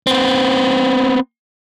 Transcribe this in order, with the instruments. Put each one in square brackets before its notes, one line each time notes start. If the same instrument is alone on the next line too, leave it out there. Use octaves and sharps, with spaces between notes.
[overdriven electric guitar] B3 C4